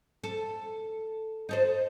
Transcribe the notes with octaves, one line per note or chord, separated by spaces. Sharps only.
A4
D#4 A4 C5